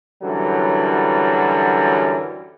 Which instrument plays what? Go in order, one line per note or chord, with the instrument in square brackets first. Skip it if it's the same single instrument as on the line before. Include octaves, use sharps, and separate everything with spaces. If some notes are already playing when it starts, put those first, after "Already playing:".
[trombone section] F#2 D3 E3 F#3 G3